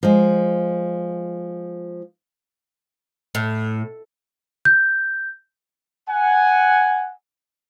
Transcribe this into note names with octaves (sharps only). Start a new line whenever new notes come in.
F3 G#3
A2
G6
F#5 G#5